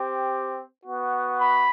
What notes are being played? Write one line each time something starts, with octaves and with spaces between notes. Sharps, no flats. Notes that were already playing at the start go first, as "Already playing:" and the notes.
Already playing: C4 G4
B3 F#4
B5